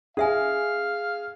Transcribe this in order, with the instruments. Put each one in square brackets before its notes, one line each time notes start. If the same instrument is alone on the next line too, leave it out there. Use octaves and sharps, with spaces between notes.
[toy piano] C#4 E5 G#5 [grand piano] G#4 [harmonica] F5